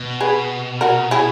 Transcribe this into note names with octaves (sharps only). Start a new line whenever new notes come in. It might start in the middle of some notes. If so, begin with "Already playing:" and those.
Already playing: B2
G#4 B4
F#4 A#4
E4 G#4